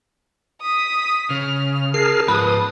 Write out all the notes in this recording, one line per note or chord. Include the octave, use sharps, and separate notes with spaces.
D#6 B6
C#3 F6
G#4 A#4 A5 F6 C7
G#2 F3 B4 D#6